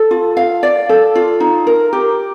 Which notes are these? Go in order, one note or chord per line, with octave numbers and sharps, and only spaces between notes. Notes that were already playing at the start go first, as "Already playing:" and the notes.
Already playing: A4
F4
F5
D5
A4
F4
D#4
A#4
G4